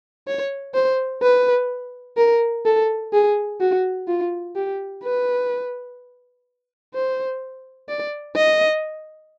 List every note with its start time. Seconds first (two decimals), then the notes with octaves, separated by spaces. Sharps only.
0.27 C#5
0.75 C5
1.22 B4
2.17 A#4
2.66 A4
3.13 G#4
3.60 F#4
4.08 F4
4.56 G4
5.04 B4
6.94 C5
7.89 D5
8.36 D#5